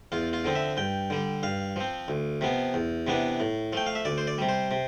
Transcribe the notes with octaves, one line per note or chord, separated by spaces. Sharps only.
E2 F4
F4
D3 F3 C4
E5
G2 G5
D3 G3
G2 F5
F3 C4
D2
C3 F3 B3
E2
C3 E3 B3 D4
A2
F3 A3 G5
F5
E5
D2 D5
C5
D5
C3 G3
C5
C3